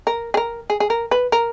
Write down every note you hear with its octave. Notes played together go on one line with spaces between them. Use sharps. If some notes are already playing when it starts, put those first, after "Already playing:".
A#4
G#4
A#4
G#4
G#4
A#4
B4
A#4